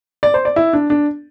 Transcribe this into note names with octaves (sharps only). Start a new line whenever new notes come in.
D5
C5
D5
E4
D4
D4